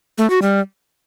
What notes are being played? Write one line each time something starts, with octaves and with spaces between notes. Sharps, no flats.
A3
F#4
G3